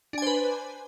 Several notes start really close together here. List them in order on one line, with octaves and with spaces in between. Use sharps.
D4 G#5 C5 B4